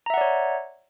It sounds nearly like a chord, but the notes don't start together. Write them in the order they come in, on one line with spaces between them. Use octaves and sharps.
A#5 E5 F#5 D5 C#5